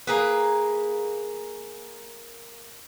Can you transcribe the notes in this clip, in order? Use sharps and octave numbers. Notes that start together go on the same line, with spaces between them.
A#3 G#4 B4